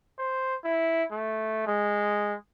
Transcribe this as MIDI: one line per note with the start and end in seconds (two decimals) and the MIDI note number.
0.18 0.55 72
0.64 1.04 64
1.11 1.66 57
1.67 2.35 56